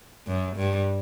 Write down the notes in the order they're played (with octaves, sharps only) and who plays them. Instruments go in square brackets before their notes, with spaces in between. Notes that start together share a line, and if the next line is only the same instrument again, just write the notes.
[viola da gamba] F#2
G2